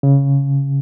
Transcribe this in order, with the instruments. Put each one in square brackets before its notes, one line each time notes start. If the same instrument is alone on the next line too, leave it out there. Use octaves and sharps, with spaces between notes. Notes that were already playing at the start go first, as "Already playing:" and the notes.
[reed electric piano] C#3